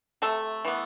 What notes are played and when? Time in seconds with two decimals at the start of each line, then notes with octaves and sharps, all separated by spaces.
0.22 C3 A3 A4
0.65 E3 B3